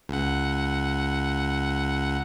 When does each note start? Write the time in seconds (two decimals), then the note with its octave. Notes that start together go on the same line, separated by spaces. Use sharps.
0.09 C#2 F#5